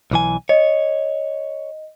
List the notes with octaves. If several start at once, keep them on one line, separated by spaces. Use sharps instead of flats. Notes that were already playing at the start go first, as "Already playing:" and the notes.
B1 E3 G#5
C#5 D#5